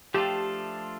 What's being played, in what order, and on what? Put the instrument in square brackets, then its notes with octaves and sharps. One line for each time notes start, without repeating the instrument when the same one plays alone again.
[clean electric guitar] F3 A3 D4 F4 A4 [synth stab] G4